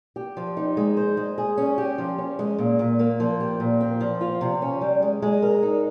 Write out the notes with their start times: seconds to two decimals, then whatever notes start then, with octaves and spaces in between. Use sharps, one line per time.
0.16 G4
0.37 F3
0.57 D#4
0.77 G#3
0.97 C5
1.17 G#3
1.38 G#4
1.57 C#4
1.78 G4
1.98 F3
2.18 C#4
2.39 G#3
2.58 A#2
2.79 A#2
2.99 A#3
3.20 F3
3.40 G4
3.60 A#2
3.81 C4
4.00 F3
4.21 F4
4.41 C3
4.62 C#4
4.81 G3
5.02 G#3
5.22 G#3
5.42 A#4
5.63 D#4